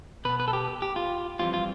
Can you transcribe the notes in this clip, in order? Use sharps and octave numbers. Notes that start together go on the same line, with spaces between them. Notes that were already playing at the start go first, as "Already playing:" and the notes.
B2 B3 B4
B4
A4
G4
G4
F4
F2 E3 G3 C4 F4
F4